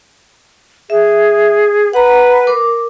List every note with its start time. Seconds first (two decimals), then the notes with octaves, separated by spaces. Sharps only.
0.90 G#4 E5
1.93 B4 F#5 A#5
2.47 A#4 D6